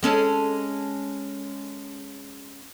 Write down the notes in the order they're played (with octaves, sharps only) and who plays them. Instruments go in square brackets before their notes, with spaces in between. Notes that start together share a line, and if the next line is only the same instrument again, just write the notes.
[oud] G#3 C#4 A4